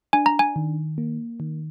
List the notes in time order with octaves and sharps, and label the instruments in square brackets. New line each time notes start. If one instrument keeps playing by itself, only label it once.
[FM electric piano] D4 [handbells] G#5
[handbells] A#5
G#5
[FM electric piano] D#3
A#3
D#3